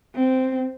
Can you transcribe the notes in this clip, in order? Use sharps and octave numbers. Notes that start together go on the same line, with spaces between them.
C4